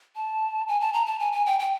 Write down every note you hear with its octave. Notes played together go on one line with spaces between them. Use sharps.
A5
G#5
A5
A#5
A5
G#5
G#5
G5
G5